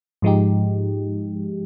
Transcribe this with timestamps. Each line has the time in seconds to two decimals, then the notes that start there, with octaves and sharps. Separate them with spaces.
0.22 G#2 F3 G#3 D#4 G4